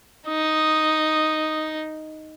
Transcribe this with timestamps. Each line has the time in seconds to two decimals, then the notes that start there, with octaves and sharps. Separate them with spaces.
0.28 D#4 D#6